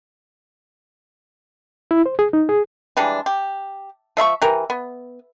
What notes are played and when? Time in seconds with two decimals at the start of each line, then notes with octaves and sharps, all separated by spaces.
1.91 E4
2.06 C5
2.19 G#4
2.33 D#4
2.49 G#4
2.97 E3 G3 G#3 D4
3.26 G4
4.17 F3 E5 B5 C#6
4.42 E3 G4 A#4
4.70 B3